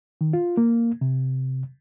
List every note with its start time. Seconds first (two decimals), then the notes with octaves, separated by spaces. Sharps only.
0.21 D#3
0.33 F4
0.57 A#3
1.01 C3